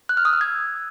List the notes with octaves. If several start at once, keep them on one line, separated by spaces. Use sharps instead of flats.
F#6
F6
D#6
E6
G#6